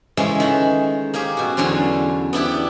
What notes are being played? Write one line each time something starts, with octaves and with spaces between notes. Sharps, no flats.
C#3 E3 G#3 A3 C#4
D#3 F#5
A#3 C#4 G4 G#4
B2 F#4
E2 D3 F#3 C#4 C6
B3 D4 E4 G4